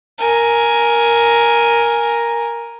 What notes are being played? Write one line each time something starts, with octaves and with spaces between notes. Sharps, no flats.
A#4 G#5